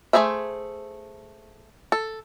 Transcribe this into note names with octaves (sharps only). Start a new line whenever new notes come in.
A3 D#4 G#4 C5 E5
A4